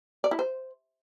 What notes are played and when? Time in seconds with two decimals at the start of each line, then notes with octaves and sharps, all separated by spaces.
0.24 D5
0.31 E4
0.39 C5